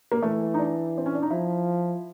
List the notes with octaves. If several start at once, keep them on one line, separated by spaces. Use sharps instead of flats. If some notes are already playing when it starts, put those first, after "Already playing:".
A#3
E3 A3
D#4
D4
C4
C#4
D4
D#4
F3 E4